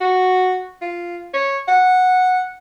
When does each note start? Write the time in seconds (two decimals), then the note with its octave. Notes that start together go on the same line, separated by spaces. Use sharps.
0.01 F#4
0.82 F4
1.34 C#5
1.68 F#5